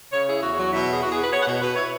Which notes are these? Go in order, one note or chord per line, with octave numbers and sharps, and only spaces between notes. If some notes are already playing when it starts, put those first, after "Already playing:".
C#3 C#5
E4 G#4
E2 F#4
F#3 F#4
B2 E4
E2
G#4
E2 F#4
G#4
B3
B4
B3 C#5
F#5
B2
B2 B4
E4 C#5